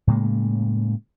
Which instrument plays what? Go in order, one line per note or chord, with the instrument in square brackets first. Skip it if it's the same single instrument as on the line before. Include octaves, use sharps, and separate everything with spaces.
[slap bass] A2 C#3 G#3 A#3